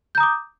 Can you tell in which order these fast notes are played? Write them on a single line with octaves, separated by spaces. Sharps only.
G6 A#5 D#6 D6